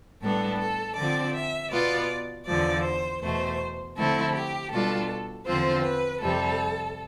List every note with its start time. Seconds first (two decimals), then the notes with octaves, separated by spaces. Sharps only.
0.22 A2 G3 B3 D4 A4
0.60 A4
0.97 D3 F3 C4 D5
1.35 E5
1.71 B2 B3 F4 D5
2.47 E2 D3 F3 D5
2.84 C5
3.22 E2 B2 A3 C5
3.96 D3 F3 A3 C4 E4 A4
4.34 G4
4.72 B2 G3 D4 F4 A4
5.46 E2 D3 F3 C4 F4 C5
5.83 B4
6.21 F2 C3 G3 A4